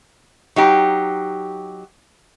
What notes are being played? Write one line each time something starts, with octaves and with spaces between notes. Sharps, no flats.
F#3 D#4 G4